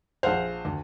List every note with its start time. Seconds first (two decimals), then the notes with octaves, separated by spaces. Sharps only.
0.23 A#1 G#4 C5 F5 F#5 F7
0.65 D2